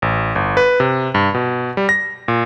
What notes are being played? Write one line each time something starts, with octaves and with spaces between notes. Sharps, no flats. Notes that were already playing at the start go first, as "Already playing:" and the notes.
A1
G1
B4
C3
G2
B2
G3
A#6
A#2